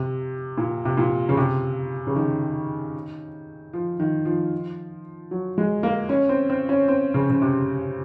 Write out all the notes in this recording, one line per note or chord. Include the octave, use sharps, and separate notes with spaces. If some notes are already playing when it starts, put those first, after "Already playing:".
Already playing: C3
A#2
C3
A#2
C#3
C3
C#3
D#3
F3
D#3
F3
F#3
G#3
A#3
C#4
C4
C4
C#4
C4
C#3
C#3
C3